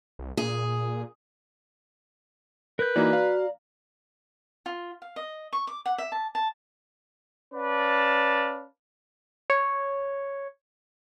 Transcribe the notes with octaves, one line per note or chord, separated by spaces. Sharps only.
C2
A#2 G#4
A#4 B4 G6
E3 A#3 D#4 F#4 D5 A#5
F5
F4
F5
D#5
C#6
D6
F#5
E5
A5
A5
C#4 B4 D5 F5 A5
C#5